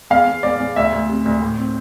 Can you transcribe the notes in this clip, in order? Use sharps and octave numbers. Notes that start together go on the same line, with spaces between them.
E2 F5
E2
E2 D5
E2
D2 E5
D2
C3
D2
A2
C4